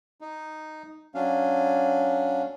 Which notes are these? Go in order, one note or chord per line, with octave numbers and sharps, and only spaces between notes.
D#4
F#3 C#4 D4 F5